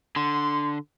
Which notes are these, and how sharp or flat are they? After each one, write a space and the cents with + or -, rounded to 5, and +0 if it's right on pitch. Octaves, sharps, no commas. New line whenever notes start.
D3 +0 C6 -15